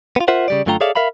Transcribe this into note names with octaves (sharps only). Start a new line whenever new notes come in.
B3 F4
F4 A#4 C5 E5 F#5
C#3 G3 D5
F#2 D3 A3 F4 G5 A#5
G#4 A4 C#5 D5 E5 F5
A#4 E5 F5 B5